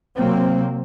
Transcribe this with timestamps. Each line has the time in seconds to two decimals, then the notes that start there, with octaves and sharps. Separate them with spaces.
0.15 C3 F#3 A#3 C4